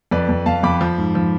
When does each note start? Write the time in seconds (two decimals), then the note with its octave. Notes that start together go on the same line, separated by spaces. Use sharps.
0.11 F2 B4 D5
0.29 F2
0.46 F2 F5 A5
0.63 F2 B5 D6
0.81 F3
0.98 G#2
1.15 F3